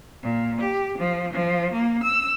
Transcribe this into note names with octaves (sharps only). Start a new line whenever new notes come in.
A#2
G4
F3
F3
A#3
E6